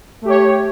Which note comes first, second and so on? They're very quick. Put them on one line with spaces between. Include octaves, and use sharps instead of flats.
A3 G4 C#5